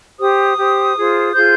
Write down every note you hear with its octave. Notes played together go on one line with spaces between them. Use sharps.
G4 C5 D#6
G4 C5
F4 G#4 C5
F4 G#4 C5 G6